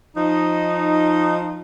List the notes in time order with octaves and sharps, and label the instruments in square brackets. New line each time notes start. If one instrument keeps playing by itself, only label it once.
[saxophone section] F3 D#4